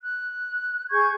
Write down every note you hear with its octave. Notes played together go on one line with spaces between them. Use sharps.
F#6
G#4 C#6 G6 G#6